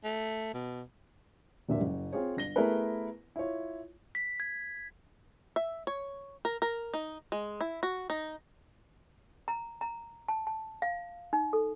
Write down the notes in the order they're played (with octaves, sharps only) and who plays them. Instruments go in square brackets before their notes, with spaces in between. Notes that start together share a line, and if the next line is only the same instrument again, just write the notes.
[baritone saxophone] A3
B2
[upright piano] D#1 G2 A#2 D3 F#3 E5
F#1
C4 F4 G#4 C#5
G1 A#6 G7
A3 B3 E4 G#4 A#4 B4
E4 F4 C#5
[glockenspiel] B6
G#6
[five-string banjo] E5
C#5
A#4
A#4
D#4
G#3
E4
F#4
D#4
[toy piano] A#5
A#5
A5
A5
F5
D#4
A4